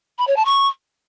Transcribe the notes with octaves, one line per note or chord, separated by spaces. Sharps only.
B5
C#5
A5
C#6